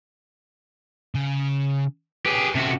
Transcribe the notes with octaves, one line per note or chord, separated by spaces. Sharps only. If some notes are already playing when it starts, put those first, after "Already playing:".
C#3
G4 G#4 B4 C#5
C3 C#4 F#4 A4